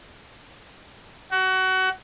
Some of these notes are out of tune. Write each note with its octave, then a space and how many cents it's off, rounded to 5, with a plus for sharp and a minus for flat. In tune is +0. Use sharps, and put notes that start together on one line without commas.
F#4 +25